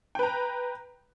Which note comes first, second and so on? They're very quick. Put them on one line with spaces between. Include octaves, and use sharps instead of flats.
G5 B4 A#5